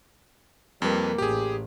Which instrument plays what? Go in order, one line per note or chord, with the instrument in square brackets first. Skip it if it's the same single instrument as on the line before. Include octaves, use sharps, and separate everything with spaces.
[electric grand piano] F2 B4 [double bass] G3 A#3
[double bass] A1 [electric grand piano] G4 G#4